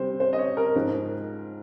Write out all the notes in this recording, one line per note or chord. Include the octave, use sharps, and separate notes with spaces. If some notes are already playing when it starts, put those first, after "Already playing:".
Already playing: C3 G3 C5
C5
D#5
C#5
A#4
G#2 F3 C4